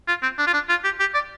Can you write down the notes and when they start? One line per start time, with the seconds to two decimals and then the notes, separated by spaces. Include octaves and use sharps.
0.08 F4
0.23 C4
0.38 D4
0.47 F4
0.53 D4
0.69 F4
0.84 G4
1.00 G4
1.14 D5